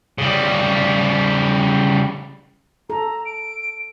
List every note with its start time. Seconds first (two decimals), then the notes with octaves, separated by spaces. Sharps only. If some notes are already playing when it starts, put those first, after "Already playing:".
0.18 C#3 G3
2.90 A4 A#5
3.25 D7